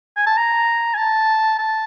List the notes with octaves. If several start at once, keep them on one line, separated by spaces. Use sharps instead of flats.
G#5
A5
A#5
G#5
A5
A5